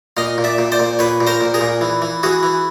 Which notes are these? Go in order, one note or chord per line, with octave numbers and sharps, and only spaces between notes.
A#2 D#5 F5
A#2
D5 E5
A#2
C5 D5
A#2
A#2 B4 C#5
A#2
A#4 C5
A#2
G#4 A#4
A#2
E3
E3
E3 F#4 G#4
E3